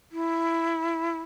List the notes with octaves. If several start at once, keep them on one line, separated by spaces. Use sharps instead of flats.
E4